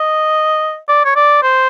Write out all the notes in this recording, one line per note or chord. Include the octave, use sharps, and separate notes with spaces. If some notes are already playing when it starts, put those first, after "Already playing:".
Already playing: D#5
D5
C#5
D5
C5